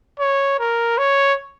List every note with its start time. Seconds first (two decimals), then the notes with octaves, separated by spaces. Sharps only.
0.19 C#5
0.59 A#4
0.98 C#5